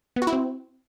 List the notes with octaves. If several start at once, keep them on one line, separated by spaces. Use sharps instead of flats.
B3
F#4
E4
C4